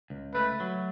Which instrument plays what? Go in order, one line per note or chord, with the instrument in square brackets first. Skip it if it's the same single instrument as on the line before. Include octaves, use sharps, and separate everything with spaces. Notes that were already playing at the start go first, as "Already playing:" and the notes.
[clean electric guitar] C#2
[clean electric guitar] A3 [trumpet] B4
[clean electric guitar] F#3